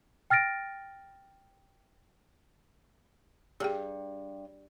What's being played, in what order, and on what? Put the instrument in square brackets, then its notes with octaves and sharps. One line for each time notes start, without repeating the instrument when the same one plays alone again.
[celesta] G5 F6 A6 A#6 D7
[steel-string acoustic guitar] G2 [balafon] G4 G#4 G5